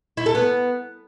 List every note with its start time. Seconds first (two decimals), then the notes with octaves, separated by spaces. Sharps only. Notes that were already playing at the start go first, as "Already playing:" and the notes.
0.17 E4
0.26 A4
0.35 B3